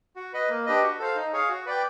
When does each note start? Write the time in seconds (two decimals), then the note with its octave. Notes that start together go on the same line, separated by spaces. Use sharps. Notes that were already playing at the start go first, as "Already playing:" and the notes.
0.16 F#4
0.33 B4 D#5
0.49 A#3
0.66 D4 G4 B4 D#5
0.83 F#4
0.99 A4 C5 F5
1.16 D#4
1.33 G#4 C#5 F5
1.49 F#4
1.66 B4 D5 G5